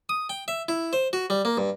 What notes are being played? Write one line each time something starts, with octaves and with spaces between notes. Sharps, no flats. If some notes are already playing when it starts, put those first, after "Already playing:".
D#6
G5
E5
E4
C5
F#4
G3
A#3
G2